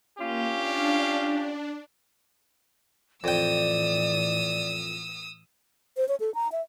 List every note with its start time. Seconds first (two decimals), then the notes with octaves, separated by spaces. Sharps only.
0.19 A#3 C#4 F4 G4
0.53 D4 F5
1.16 D4
3.24 F2 A2 E3 D5 G5 D#6 E6
5.97 C5
6.08 C#5
6.20 A4
6.35 A#5
6.52 E5